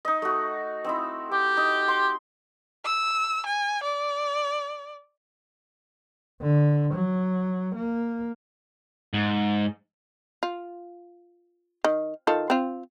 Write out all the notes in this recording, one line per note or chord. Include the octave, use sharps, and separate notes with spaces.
D#4 D#5
A3 F#4
C4 D#4 E4
G4 D6
D#4
C6
E6
G#5
D5
D3
F#3
A#3
G#2
F4
D#3
D#3 F4 A4
C4 F4